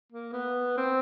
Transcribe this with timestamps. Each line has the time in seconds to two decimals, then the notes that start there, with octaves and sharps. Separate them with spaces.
0.12 A#3
0.33 B3
0.77 C4